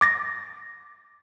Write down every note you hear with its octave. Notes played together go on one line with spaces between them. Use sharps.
D6 A6 A#6